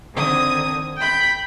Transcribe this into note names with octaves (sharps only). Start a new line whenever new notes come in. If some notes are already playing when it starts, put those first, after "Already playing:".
D3 D#3 C4 D#6 G#6
G5 B5 G6